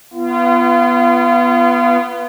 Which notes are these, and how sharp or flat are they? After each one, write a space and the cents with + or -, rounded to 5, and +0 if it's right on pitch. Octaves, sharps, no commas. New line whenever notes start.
B3 +0 F4 -35